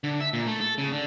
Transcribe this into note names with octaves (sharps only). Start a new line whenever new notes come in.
D3
E5
A#2
A3
A4
C#3
D3